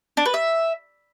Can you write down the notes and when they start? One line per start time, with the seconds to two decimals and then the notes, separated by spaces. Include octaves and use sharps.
0.17 D4
0.25 B4
0.34 E5